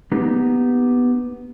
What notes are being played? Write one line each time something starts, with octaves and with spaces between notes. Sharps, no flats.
A#3 B3 D4 D#4 G4